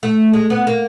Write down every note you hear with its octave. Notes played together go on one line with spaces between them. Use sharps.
A3
G#3
B3
A#3